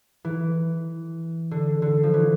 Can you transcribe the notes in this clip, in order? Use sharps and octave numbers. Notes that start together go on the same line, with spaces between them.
E3
D3
D3
F3
E3